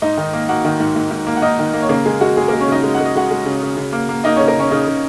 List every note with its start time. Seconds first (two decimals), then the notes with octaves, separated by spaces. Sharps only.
0.02 G#2 D#4 D#5
0.18 D#3
0.33 A#3
0.49 A#3 F#4 F#5
0.65 D#3
0.80 G#2
0.96 G#2
1.11 G#2
1.27 A#3
1.37 F#5
1.42 A#3 D#4 D#5
1.59 D#3
1.74 A#3
1.82 C#5
1.89 C#3 A#3 A#4
2.05 C#3 G#3 G#4
2.21 G#3 F#4
2.37 G#3 G#4
2.48 G#3 A#3 A#4
2.60 C#4 C#5
2.68 C#3 D#4 D#5
2.83 G#3
2.94 F#5
3.00 G#3
3.06 D#5
3.15 G#3 F#4 F#5
3.31 G#3
3.46 C#3
3.62 C#3
3.77 C#3
3.93 A#3
4.09 A#3
4.24 A#3 D#4 D#5
4.36 C#3 C#4 C#5
4.47 A#3 A#4
4.55 C#3 C#4 C#5
4.71 C#3 D#4
4.87 C#3